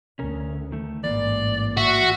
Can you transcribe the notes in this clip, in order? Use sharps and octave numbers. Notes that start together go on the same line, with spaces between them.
D2 C#4 A#4
D#3 A3
A1 G#2 E3 A#3 D5
F#4 E5